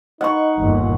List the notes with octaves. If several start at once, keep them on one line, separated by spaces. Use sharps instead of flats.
D#4 D#5 F#5 C#6
G1 D#2 A#2